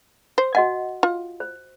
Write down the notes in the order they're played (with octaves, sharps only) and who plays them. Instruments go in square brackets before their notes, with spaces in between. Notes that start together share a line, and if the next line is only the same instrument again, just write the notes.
[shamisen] C5
[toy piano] F#4 D#5 F#5 [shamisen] G#5
[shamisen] F4
[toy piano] C5